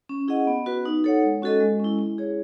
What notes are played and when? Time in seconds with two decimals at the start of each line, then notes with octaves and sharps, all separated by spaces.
0.09 C#4
0.28 E4 G#4 D#5 F#5
0.47 B3
0.66 F#4 B4
0.86 D#4
1.04 A4 C#5 F#5
1.23 G#3
1.42 C#4 F#4 A4 D#5
1.61 G#3
1.80 C#4 E4
1.99 E4
2.18 G#4 C#5